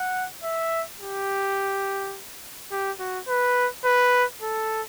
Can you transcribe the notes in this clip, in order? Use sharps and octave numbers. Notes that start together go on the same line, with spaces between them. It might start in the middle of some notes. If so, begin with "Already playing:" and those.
Already playing: F#5
E5
G4
G4
F#4
B4
B4
A4